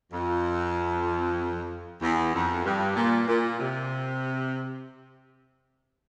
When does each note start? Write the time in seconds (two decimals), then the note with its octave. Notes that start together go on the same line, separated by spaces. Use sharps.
0.12 F2
2.02 E2
2.34 F2
2.65 G2
2.96 A#2
3.28 A#2
3.60 C3